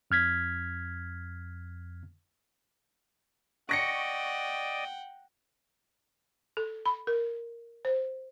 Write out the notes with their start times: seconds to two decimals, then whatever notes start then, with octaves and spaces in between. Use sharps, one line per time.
0.11 F2 F6 G#6 B6
3.69 D5 D#5 F#5 G5 C#6 A#6 C#7
6.57 A4
6.85 B5
7.07 A#4
7.85 C5